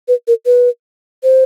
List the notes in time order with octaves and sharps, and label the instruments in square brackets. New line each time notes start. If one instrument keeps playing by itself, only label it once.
[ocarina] B4
A#4
B4
C5